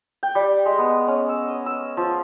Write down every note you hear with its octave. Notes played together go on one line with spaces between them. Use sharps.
G5
G3
G#3
B3
C#4
E6
D#5
E6
F3